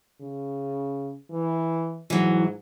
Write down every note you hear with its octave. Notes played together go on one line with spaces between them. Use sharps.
C#3
E3
G#2 E3 F#3